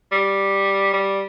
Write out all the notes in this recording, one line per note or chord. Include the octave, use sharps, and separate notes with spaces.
G3
G3